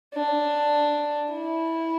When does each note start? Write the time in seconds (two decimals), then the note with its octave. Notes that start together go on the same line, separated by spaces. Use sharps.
0.14 D4
1.32 E4